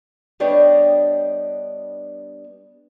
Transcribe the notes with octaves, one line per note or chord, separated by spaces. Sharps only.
G3 B3 D4 C#5 D#5 G5